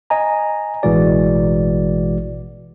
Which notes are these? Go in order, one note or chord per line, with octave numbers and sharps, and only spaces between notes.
D#5 G#5 A#5
A1 B2 E3 G#3 F#4 D5